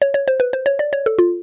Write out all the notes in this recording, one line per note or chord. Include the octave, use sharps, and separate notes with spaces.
C#5
C#5
C5
B4
C5
C#5
D5
C#5
A4
F4